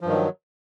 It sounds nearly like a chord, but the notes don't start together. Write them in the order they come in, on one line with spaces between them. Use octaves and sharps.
F3 G2 D#3 F#3